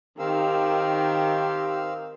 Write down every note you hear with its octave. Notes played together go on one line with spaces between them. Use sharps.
D#3 C4 G4 F5 E6